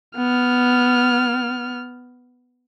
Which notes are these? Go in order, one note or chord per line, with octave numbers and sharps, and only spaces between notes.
B3 F6